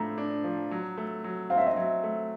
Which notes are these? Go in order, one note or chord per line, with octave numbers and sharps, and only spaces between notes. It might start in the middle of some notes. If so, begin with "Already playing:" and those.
Already playing: A2 F3 A3 D4 A#5
D4
F3
F#3
A3
F#3
C4 F5
E5
D#5
F#3 E5
A3